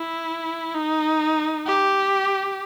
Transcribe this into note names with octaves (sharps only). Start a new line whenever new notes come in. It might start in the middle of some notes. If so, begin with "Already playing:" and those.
Already playing: E4
D#4
G4